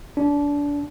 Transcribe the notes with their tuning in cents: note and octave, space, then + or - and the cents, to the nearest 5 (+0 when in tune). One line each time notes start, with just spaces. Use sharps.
D4 -25